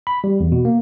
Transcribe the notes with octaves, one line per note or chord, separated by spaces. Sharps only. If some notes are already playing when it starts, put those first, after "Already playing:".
B5
G3
E2
B2
A#3